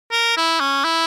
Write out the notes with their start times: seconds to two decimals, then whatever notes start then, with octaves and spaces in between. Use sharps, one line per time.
0.12 A#4
0.37 E4
0.60 C#4
0.85 E4